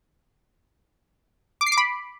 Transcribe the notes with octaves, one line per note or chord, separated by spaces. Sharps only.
D6
C7
D6
B5